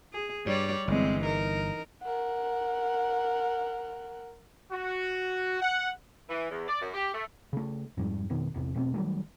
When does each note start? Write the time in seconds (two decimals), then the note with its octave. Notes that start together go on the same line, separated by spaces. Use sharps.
0.13 G#4
0.46 G2 G3 C#5 D5
0.88 G1 E3 G#3 C4
1.24 D#4 A#4
2.03 A#4 F#5
4.72 F#4
5.61 F#5
6.29 E3
6.50 E2
6.68 D5
6.81 F#2
6.94 G4
7.14 A3
7.53 C#3 A3
7.97 F2 G#2 G3
8.30 F2 B2 D#3 B3
8.54 G#1 E2 C3
8.75 E1 B2 A3 C4
8.94 D#3 F#3 G3 A3